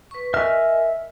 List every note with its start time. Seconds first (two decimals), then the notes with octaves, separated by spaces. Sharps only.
0.11 B4 C#6
0.34 A#4 D#5 E5 G#5 F6